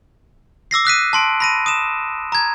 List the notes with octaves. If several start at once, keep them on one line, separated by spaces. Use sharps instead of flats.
D6 E6 A#6 C7
D#6 F#6 B6 D#7
A5 C6 D7
B5 A#6 D#7
D#6 E7
A#5 G#6